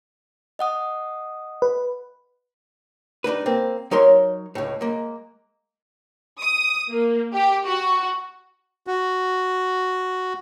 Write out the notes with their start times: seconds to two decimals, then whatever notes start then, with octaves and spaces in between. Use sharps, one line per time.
0.59 D#5 F#5 D#6
1.62 B4
3.24 G3 D4 D#4 B4
3.46 A#3 C4
3.91 F#3 D#4 A#4 C#5 C6
4.55 C#2 A2
4.81 G#3 A#3
6.41 D#6
6.91 A#3
7.34 G4
7.65 F#4
8.87 F#4